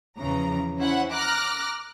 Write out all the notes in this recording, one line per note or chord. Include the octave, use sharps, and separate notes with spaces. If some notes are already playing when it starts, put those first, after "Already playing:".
E2 C#3 E3 F3 A#5
C#4 E4 C5 F#5
A#5 D6 F6 F#6 A#6